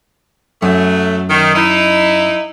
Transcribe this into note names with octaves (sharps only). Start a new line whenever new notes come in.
F#2 F#3 A3
D#3
D#4 E4